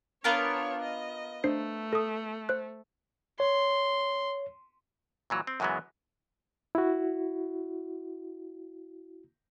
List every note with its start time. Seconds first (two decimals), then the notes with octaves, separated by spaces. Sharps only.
0.24 B3 D4 F4 A#4 C#5
0.83 D#5
1.44 A3 D4 C5 C7
1.93 A4 D#6
2.49 C5 F#6
3.40 C#5 C6
5.30 A#2 E3 F#3
5.47 C4
5.60 F#2 C#3 E3 F#3 G#3 B3
6.75 E4 F#4